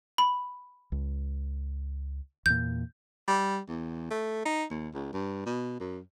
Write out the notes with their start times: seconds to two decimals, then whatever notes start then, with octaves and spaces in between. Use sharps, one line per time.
0.18 B5
0.92 C#2
2.46 E2 A#2 G6
3.28 G3
3.68 E2
4.10 A3
4.45 D#4
4.70 D#2
4.94 C#2
5.13 G2
5.46 B2
5.80 F#2